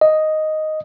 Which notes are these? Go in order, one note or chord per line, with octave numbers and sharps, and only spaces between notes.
D#5